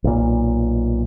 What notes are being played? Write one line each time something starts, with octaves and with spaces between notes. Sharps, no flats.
B1 A#2